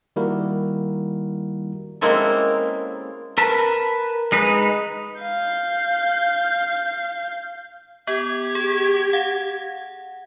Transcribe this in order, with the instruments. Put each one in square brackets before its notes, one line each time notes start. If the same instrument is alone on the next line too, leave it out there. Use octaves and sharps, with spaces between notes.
[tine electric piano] D#3 G3 A#3 E4 F#4 A#4
[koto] G#3 A#3 C4 C#4 E4 A4
[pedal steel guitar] A#4 B4 A5
G#3 D#4 B4
[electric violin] F5 G6
[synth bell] B3 [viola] G4 [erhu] G#6
[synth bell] G#4
F5 F#5